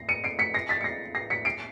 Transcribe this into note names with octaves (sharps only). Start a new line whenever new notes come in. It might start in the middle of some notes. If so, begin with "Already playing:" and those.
Already playing: A#6 C7
C#7 D#7
C7 D7
B6 C#7
A#6 C7
A6 B6
C#7
A#6 C7
A#6 C7
B6 C#7
C7 D7